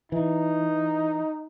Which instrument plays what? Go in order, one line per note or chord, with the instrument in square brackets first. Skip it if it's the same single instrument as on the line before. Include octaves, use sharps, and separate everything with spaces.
[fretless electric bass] E3 [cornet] D#4